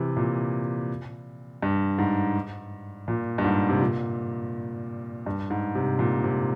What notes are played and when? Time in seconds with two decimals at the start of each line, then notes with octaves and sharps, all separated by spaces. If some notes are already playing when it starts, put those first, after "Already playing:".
Already playing: C3 E3
0.17 A#2
1.62 G2
1.98 G#2
3.08 A#2
3.38 G2
3.44 G#2
3.69 C3
3.81 A#2
5.26 G2
5.50 G#2
5.75 C3
5.99 A#2
6.24 C3